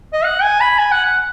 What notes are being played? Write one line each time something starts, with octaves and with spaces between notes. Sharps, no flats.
D#5
F#5
G#5
B5
G#5
F#5
F#5